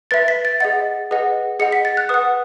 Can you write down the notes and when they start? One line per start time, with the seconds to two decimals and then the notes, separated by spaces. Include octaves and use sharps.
0.11 B4 E5 A6
0.28 B6
0.45 A6
0.60 G#4 D#5 F#5 A6
1.11 G#4 B4 D#5 F#5
1.60 G#4 D#5 F#5 C#7
1.72 B6
1.85 A6
1.97 F#6
2.09 B4 F#5 D#6